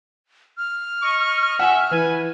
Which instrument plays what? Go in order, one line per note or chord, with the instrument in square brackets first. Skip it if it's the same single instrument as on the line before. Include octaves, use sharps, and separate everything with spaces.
[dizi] F6
[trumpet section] D#5 C#6
[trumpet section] E5 [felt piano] F#5 G#5
[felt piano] E3 [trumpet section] B4 G#5